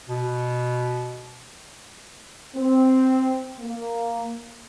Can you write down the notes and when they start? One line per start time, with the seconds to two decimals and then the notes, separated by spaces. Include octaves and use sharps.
0.09 B2
2.56 C4
3.59 A#3